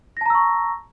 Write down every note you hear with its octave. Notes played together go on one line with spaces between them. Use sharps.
A5 A#5 C#6 E6 A#6